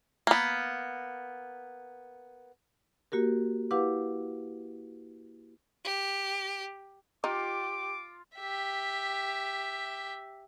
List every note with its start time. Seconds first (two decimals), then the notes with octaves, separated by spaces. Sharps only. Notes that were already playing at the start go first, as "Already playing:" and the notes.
0.27 A#3 B3
3.12 A#3 F#4 G4 A#4
3.71 E4 G4 B4 F5 F#5 D6
5.84 G4
7.24 D#4 F4 G4 D6
8.37 G4 E5